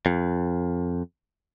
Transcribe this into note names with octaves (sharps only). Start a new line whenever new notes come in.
F2